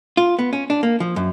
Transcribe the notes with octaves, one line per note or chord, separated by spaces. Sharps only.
F4
B3
C#4
D4
A#3
F3
F#2